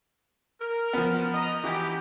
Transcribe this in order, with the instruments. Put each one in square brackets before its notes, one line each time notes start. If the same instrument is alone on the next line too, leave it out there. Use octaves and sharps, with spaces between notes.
[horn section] A#4
[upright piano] F3 B3
[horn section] D#5 A#5
[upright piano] E3 [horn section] E4 F#4 G4